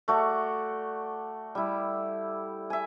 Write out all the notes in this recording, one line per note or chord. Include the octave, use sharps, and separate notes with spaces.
A3 F#4 D5
G3 E4
E5 G#5